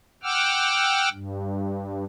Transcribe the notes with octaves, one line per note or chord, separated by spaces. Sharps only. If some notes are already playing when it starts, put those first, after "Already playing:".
F#5 G5 D6 E6 F6
G2